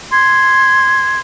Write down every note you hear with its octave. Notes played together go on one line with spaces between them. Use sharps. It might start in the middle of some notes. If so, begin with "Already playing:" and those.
C6 G#6